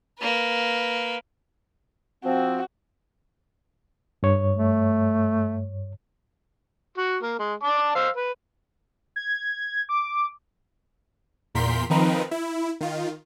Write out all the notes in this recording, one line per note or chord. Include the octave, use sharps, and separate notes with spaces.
A#3 B4
F3 C4 F#4
G2 C#5
A3
F#4
A#3
G#3
D5 A5 D6
C5 F5 E6
B4
G#6
D6
E2 A#2 A#4 C6 G6 B6
D#3 F3 C4 D#4 A#4 B4
E4
D#3 F4